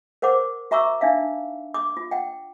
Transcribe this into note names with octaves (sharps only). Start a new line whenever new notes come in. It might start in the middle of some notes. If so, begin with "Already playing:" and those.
A#4 C5 F#5 D6
F#4 E5 A#5 C#6 D6 E6
D4 D#4 E5 F5
D6 D#6
F4
F#5 G5